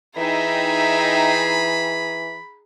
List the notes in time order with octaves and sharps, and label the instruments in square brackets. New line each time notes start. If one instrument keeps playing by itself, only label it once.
[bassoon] E3 [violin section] D#4 E5 G5 [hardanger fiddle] G#4 A#5 [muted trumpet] B5